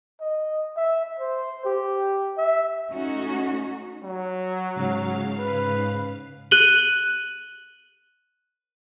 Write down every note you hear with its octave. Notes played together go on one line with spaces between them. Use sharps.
D#5
E5
C5
G4
E5
A3 C#4 D#4 F#4
F#3
G#2 C#3 F5
B4
F#6 D#7 F#7 G7